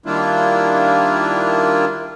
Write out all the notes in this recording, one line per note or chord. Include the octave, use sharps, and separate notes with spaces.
D#3 G3 A#3 D4 E4 F4